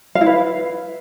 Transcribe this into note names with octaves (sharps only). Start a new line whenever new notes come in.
F5
E4
B4